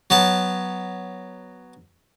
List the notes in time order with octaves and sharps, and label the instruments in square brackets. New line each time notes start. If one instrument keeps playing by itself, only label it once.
[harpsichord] F#3 B3 A5